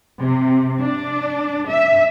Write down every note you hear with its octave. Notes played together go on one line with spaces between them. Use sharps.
C3
D4
E5